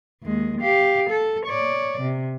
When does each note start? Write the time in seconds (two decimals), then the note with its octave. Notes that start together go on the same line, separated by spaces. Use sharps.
0.23 D#2 G#3
0.61 G4 F5
1.10 A4
1.46 C#5 D5
2.01 C3